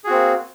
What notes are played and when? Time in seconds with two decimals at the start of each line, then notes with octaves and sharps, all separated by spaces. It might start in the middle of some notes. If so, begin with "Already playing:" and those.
0.04 G#4
0.07 F#4
0.10 C4
0.13 A#3